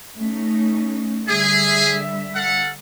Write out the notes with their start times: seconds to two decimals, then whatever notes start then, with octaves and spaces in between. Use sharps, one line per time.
0.18 A3 C#4 D#4
1.28 D3 G3 G#4 E5
2.35 A4 F5 F#5